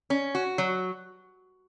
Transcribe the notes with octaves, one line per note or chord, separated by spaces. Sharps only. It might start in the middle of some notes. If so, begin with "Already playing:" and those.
C#4
F#4
F#3